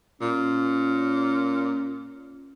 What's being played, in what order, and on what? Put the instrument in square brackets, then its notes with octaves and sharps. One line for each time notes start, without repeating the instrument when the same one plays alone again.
[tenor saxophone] A#2 [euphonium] C#4